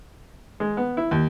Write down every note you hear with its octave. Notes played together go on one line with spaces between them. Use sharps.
G#3
B3
E4
D#2